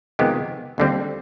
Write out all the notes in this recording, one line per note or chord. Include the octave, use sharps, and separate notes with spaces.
F2 C3 D#3 G#3 B3 G4
D#2 D3 G3 C4